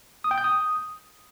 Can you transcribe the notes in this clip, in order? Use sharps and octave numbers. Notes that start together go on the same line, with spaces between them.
D#6
G5
G6
D#6